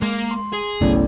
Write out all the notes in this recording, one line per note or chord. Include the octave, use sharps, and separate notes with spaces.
G#3 A#3
C6
G#4
G1 C2 A2 F#3 B3 C#4 D5